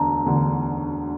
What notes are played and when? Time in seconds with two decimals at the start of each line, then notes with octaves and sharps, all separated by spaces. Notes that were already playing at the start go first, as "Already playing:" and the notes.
Already playing: E1 D2 D3 A5 A#5
0.25 E1 D2 D3